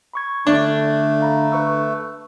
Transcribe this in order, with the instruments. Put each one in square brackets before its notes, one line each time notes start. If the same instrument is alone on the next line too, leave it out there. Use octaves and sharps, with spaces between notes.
[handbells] B5 C#6 G#6
[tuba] D3 [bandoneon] A3 [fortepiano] D4
[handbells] F5 A#5 B5
B4 C#6 E6